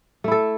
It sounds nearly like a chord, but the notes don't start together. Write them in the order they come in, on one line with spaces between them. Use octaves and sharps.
A3 E4 A4